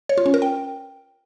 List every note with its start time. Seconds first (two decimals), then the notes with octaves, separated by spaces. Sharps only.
0.09 C#5
0.18 F4
0.26 C#4
0.34 A#4
0.42 G5